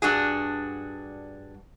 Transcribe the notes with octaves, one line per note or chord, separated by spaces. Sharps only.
G2 D4 F#4 G#4